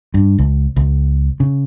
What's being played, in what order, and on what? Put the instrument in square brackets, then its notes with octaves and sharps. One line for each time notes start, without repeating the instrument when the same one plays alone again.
[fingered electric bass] G2
C#2
C#2
C#3